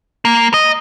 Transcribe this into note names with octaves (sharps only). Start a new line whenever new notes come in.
A#3
D#5